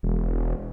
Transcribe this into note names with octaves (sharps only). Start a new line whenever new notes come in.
E1